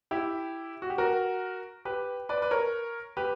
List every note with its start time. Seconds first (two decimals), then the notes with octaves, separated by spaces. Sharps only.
0.11 E4 G4
0.82 F#4
0.90 G4
0.98 F#4 A#4
1.85 G4 B4
2.29 B4 D5
2.42 B4
2.51 A#4 C#5
3.17 G4 B4